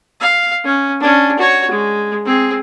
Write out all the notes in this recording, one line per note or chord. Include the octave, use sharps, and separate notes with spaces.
F5
C#4
C#4 D4
F#4 C#5
G#3
C4 G#4